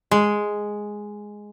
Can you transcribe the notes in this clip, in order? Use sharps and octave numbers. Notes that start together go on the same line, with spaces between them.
G#3